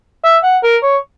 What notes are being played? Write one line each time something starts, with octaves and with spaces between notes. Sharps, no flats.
E5
F#5
A#4
C#5